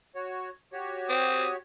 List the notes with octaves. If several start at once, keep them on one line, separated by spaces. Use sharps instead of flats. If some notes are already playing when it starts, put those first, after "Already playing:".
F#4 C#5
F#4 G4 C#5
C4 D#6